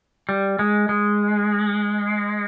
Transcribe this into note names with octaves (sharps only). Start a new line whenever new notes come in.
G3
G#3
G#3